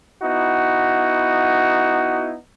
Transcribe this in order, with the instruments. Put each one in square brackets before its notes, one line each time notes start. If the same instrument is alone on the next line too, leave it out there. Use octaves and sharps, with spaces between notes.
[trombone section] B3 D#4 E4 F#4